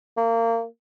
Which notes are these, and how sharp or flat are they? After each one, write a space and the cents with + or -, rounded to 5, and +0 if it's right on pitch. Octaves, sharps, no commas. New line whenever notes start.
A#3 -25